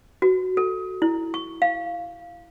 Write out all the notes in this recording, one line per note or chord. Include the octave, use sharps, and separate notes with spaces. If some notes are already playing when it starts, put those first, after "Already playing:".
F#4
A4
E4
C#6
F5